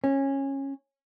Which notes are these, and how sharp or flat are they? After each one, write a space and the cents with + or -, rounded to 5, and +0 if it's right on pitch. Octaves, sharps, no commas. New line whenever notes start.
C#4 -20